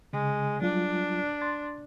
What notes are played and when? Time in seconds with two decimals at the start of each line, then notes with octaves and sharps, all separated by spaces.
0.13 C#3 G#3
0.62 F#3 G3 D4 F4
1.41 C6 A6